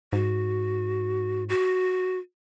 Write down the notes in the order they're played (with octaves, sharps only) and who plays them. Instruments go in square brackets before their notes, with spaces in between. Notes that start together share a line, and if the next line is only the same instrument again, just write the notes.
[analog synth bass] G#2 [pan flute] F#4
[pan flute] F#4